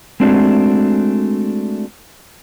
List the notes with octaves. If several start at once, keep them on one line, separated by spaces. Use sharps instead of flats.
G#3 A3 C4 D4 F#4